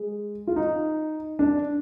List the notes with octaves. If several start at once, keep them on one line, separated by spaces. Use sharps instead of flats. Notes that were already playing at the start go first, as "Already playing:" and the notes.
Already playing: G#3
F4
D#4
D4